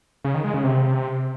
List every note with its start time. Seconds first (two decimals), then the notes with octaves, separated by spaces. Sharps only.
0.24 C#3
0.34 D#3
0.44 G#3
0.54 C#3
0.64 C3